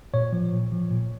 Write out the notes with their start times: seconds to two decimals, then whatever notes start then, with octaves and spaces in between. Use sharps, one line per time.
0.14 A#2 C#5
0.33 F3
0.52 A#2
0.72 F3
0.91 A#2